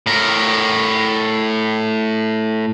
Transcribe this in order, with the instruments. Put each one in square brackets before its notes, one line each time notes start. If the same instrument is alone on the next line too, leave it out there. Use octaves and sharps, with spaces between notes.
[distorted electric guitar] A2 A#4